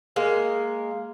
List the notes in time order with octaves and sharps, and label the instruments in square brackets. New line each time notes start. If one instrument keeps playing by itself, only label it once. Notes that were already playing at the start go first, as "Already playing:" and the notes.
[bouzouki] G#3 A#3 A#4